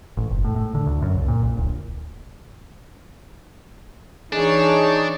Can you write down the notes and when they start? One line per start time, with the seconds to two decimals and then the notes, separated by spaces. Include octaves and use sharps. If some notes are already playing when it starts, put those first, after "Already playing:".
0.17 A1
0.31 F#1
0.44 A2
0.56 A2
0.75 D3
0.86 D2
1.02 F#2
1.15 C2
1.28 A#2
1.43 A#1
1.57 D1
4.33 E3 D4 D#4 G#4 C#5